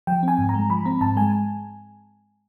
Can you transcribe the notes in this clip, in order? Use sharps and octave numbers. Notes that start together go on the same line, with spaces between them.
F3 G5
C4 G#5
G#2
A#5
G#3
F3 B5
C4 A#5
G#2 A5
G#3 G#5